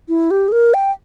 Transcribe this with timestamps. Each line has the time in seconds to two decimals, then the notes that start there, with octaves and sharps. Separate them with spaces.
0.09 E4
0.31 G4
0.48 G#4
0.52 A#4
0.74 G5